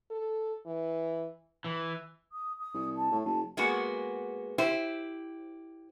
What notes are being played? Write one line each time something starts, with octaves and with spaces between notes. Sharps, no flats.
A4
E3
E3
D#6
D#6
C2
A5
A2
F#1 A5
G#3 A#3 B3 F#4 G#4
E4 G4 C5